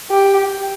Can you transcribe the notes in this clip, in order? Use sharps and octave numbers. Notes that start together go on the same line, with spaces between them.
G4